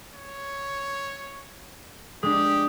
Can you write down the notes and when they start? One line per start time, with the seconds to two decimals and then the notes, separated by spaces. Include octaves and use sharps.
0.14 C#5
2.23 G#3 D4 G4 D#6